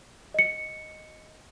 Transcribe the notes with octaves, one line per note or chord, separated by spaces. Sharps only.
D#5 C#7